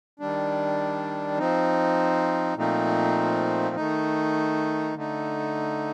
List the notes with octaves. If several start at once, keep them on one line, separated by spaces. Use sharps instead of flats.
D#3 G3 D4
F3 C4 D#4
A#2 F3 A3 C4 D#4
D#3 A3 D#4
D3 A3 D#4